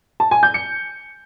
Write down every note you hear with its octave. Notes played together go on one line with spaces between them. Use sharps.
A5
G#5
G6
C#7